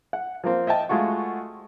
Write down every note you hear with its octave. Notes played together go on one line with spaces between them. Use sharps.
F#5
F3 A#3 C4
D#5 E5 G5 A5
G#3 A3 F4 F#4